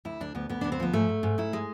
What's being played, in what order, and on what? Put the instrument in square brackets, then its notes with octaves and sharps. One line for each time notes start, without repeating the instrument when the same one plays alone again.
[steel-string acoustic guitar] D2 E4
D2 D4
D2 B3
D2 B3
D2 D4
C4
F3 B3
G#2 A3
G#2
G#2
G#2 E4
G#3